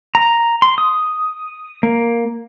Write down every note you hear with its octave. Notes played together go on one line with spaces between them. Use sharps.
A#5
C6
D#6
A#3